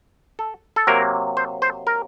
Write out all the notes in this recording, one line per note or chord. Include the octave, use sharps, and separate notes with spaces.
A4
A4
C3 F#3 A#3 A#4
C5
C5
A#4